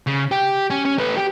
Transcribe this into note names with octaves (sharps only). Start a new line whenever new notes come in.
C#3
G4
C#4
C#4
A3 B4
G4